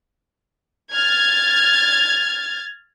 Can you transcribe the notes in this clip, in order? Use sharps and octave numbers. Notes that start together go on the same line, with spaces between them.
F6 G#6 A6